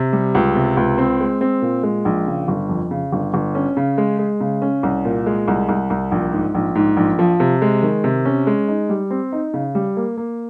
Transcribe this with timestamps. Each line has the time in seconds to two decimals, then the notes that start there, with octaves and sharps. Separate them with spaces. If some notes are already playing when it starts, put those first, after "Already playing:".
Already playing: C3
0.13 G3
0.35 C#2
0.55 C3
0.77 C#2
0.98 C4
1.20 G#3
1.41 C4
1.62 A#2
1.83 G#3
2.05 A#1
2.27 C#3
2.48 G1
2.69 F2
2.91 C#3
3.13 G1
3.34 G1
3.55 C#4
3.77 C#3
3.98 G#3
4.19 G#3
4.41 C#3
4.62 C#4
4.83 C2
5.05 A#2
5.26 G#3
5.48 C2
5.69 C2
5.90 C2
6.12 A#1
6.32 G#2
6.55 A#1
6.75 G#2
6.97 A#1
7.19 F3
7.40 C3
7.62 G#3
7.83 D#3
8.04 C3
8.25 C#4
8.47 G#3
8.68 D#4
8.89 G3
9.11 C4
9.32 D#4
9.54 C#3
9.75 G3
9.97 A#3
10.17 A#3